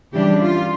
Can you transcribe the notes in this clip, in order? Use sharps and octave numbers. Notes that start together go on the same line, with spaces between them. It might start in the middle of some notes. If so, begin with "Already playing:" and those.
C#3 E3 G3 D4 G4
F4